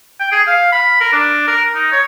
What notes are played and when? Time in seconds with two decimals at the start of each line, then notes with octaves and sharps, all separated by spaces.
0.20 G5
0.32 G#4
0.47 F5
0.72 B5
1.01 A#4
1.13 D4
1.47 A#4
1.75 D#4
1.92 C#5